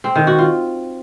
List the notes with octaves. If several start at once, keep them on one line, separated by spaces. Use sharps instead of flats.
C4
D#3
F#4
F4